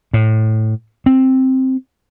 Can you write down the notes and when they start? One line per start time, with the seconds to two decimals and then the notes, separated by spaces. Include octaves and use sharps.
0.13 A2
1.06 C4